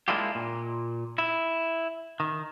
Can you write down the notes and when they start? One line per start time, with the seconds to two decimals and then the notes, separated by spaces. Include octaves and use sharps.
0.08 G#3 A#3 D4 E4 F4 G4
0.35 A#2
1.18 E4
2.20 D#3